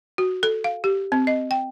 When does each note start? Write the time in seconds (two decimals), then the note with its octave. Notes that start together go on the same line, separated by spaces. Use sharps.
0.18 F#4
0.43 A4
0.64 F5
0.84 G4
1.12 C4
1.27 D#5
1.51 G5